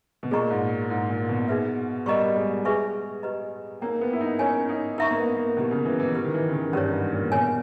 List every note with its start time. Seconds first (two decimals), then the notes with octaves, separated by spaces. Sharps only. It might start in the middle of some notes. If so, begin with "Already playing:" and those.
0.23 B2
0.31 A#2 G#4 D#5 A#5 C#6
0.51 G#2
0.89 G#2 E4 A#4 C#5
1.10 A#2
1.29 B2
1.48 D#4 G#4 B4 E5
2.06 G3 A#4 D#5 A#5 C#6
2.35 G#3
2.65 G#4 B4 E5 G#5 C#6
3.23 G4 B4 D#5 A#5
3.81 A#3 D#4 A#4 C#5 G5
4.01 B3
4.13 E4
4.21 D#4
4.39 C#4 A#4 C#5 G#5
4.69 D#4
4.98 D#4 A#4 E5 A#5 C#6
5.11 A#3
5.18 B3
5.37 A#3
5.57 B2 C#4 E4 G4
5.71 C#3
5.85 E3
6.00 E3
6.15 E4 G4 B4
6.24 D#3
6.34 E3
6.49 C#3
6.54 D#3
6.73 G2 C#4 G4 C#5
6.93 G#2
7.12 A#2
7.32 B2 A#4 C#5 G#5